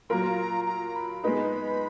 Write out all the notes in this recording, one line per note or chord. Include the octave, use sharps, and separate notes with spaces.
F#3 A#3 F4 A#4 A#5 B5
A#5
B5
G#3 B3 D#4 B5